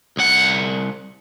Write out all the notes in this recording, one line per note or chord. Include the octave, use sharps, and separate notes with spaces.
C2 F#5